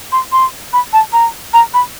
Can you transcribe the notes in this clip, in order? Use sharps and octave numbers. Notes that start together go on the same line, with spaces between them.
C6
C6
B5
A5
A#5
A#5
B5